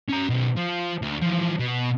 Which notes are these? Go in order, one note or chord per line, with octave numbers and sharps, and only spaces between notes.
C#4 A#5
B2 C#4
F3
D2
E3 F3
B2